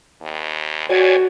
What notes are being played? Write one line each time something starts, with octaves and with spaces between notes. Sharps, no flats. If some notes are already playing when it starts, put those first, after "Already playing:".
D#2
F2 F#4 C#5 D5 G#5